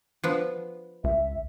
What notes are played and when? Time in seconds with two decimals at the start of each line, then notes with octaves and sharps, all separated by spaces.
0.24 F3 B3 D4
1.04 C#2 E5